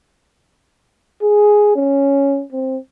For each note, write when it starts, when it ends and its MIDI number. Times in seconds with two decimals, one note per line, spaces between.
1.22 1.71 68
1.76 2.43 61
2.52 2.77 60